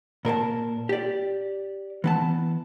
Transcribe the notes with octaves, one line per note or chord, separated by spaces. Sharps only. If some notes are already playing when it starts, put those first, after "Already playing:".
A#2 A#4 C#5 A5
G4 D5
E3 B3 A5